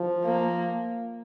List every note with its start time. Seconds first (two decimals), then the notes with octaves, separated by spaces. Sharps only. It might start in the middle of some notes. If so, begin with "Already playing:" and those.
Already playing: F3
0.24 A#3